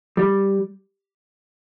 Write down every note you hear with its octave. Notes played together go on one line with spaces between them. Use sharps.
G3